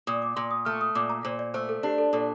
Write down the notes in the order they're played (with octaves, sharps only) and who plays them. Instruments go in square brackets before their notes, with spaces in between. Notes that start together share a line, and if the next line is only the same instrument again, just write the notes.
[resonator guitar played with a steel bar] A#2 [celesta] D#6
[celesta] D6
[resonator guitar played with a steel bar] A#2 [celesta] C6
[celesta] D#6
[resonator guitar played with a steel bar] A3 [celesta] F6
[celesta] D#6
[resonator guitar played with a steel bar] A#2 [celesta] D6
[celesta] A#5
[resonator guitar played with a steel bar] A#2 [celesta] C5
[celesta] D5
[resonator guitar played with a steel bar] A3 [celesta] C5
[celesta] A4
[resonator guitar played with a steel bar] D4 [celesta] G4
[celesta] A4
[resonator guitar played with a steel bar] A#2 [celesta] A4